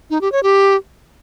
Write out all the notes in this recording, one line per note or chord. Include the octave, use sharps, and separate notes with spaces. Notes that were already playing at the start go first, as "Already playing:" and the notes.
D#4
G4
C#5
G4